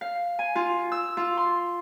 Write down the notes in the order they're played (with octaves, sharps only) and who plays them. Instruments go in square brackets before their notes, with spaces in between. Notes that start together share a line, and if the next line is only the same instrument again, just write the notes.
[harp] F5
G#5
F4
E6
F4
C6